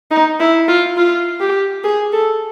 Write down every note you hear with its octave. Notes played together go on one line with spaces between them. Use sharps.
D#4
E4
F4
F4
G4
G#4
A4